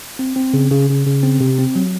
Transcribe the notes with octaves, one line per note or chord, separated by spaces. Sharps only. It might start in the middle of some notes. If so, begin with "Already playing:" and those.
C4
C4
C#3
C#3
C#3
C#3
C4
C3
C4
F#3